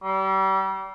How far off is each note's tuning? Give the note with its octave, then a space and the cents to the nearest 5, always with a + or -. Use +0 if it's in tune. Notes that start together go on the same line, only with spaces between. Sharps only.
G3 -35